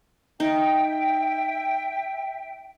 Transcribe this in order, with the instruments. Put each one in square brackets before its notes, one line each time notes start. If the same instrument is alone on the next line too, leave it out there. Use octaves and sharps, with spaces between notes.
[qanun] D#4 [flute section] E5 G5